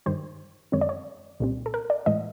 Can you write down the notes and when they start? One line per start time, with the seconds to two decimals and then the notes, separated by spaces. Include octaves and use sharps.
0.06 G2 D#3 G3 C5
0.72 F#2 D#3 G#3 C4 C#5
0.81 D5
0.89 C#5
1.40 C2 A#2 G3 C4
1.66 A4
1.74 A#4
1.90 D5
2.06 A2 E3 G#3 D#5